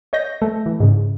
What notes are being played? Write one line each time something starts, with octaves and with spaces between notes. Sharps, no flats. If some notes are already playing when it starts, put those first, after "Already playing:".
C#5 D#5 G6 A#6
A3
E3
G#2 C#3